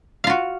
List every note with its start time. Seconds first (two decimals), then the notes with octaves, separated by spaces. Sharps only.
0.24 F5
0.27 F4
0.30 F#4